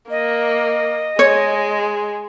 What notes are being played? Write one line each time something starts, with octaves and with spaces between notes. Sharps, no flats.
A#3 D#5
G#3 C#5